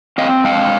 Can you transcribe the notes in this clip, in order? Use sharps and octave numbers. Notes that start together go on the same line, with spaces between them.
C4 D#5 F5
G#3 F5 G5